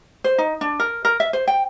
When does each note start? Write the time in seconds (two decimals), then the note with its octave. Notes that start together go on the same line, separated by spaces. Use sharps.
0.24 C5
0.38 D#4
0.61 D4
0.80 A#4
1.05 A#4
1.20 E5
1.33 C5
1.48 G5